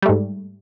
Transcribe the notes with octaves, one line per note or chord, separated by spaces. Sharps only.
G#2 G3 A3